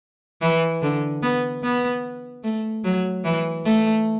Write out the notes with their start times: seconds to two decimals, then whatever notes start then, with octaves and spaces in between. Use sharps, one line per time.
0.42 E3
0.82 D3
1.23 B3
1.63 B3
2.44 A3
2.84 F#3
3.24 E3
3.65 A3